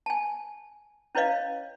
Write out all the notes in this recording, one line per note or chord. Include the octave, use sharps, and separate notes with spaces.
G#5 A5
C#4 E4 B4 C#5 D#5 F5